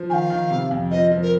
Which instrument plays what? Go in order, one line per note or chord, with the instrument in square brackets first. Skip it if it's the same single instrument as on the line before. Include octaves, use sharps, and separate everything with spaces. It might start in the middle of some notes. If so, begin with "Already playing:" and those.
Already playing: [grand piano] F3
[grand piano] D#3 [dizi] F5 G#5
[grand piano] D#3
C3
F2
[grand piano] F3 [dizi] D#5
[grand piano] F3
[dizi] A#4